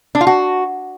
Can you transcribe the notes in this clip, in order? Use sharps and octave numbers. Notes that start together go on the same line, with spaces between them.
D4
F4
F#4